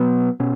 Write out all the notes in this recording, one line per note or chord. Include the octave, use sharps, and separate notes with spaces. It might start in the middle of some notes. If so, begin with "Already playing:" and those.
Already playing: B2 F#3 B3
B2 C#4